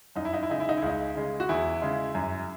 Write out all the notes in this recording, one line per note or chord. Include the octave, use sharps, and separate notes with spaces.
F#2 D#4
E4
D#4
E4
C#3 G#3 D#4
E4
D#4
E4
C#2 D#4
C#3 G#3
F#4
E2 E4
C#3 G#3
F#2